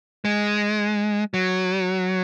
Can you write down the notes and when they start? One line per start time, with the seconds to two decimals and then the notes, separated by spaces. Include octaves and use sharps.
0.25 G#3
1.34 F#3